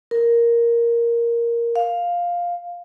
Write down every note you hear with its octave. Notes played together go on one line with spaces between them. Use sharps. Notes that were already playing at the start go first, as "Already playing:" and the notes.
A#4
F5